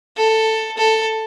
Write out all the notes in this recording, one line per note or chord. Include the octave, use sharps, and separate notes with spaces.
A4
A4